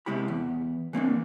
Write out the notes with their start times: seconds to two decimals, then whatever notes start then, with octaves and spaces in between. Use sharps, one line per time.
0.06 C3 G#3 E4 G4 B5
0.28 E2
0.93 E3 A#3 C4 D4